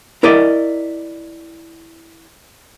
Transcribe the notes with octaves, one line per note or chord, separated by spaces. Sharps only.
E4 A#4 D5 D#5